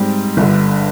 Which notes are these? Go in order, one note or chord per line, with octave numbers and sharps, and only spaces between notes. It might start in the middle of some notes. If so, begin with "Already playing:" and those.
Already playing: G#2 G3 C4
G1 G2 D3